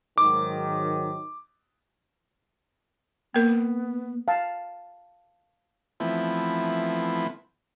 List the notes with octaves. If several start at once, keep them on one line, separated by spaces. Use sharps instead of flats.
G#2 D#3 F#3 D6
A#3 B3 A#4
F5 A5
E3 F3 A3 B3 C4 E4